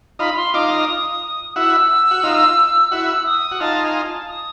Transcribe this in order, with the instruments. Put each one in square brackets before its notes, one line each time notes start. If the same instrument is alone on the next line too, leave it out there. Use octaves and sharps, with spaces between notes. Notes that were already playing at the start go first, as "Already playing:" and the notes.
[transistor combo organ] D#4 F4 [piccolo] B5
[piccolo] C6
[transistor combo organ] D#4 F4 [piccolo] D6
[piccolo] D#6
[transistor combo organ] E4 F#4 [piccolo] E6
[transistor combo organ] F#4
D#4 F4
[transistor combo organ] E4 F#4 [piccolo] E6
[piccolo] D#6
[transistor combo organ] F#4
[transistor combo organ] D#4 F4 [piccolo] A5
[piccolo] G#5
A5
D#6